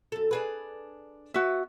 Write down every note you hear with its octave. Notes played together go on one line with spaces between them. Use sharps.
F#2 A4
D4 G#4 B4
B3 F#4 E5